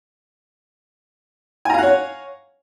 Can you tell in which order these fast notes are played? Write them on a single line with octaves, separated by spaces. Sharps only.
G#5 A#5 F5 F#5 C#5